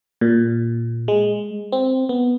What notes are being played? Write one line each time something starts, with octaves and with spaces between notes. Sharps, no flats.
A#2
G#3
C4
B3